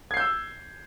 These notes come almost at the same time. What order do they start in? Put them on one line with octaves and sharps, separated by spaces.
G#6 C7 G6 E6